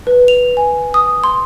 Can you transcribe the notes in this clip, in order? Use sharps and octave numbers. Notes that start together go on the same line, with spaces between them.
B4
F7
G#5
D#6
C6